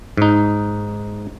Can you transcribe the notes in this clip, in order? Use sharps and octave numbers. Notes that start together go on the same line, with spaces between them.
G#2 D#4